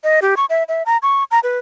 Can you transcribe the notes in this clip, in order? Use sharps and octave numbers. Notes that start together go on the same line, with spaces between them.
D#5
G4
C#6
E5
E5
A#5
C#6
A#5
B4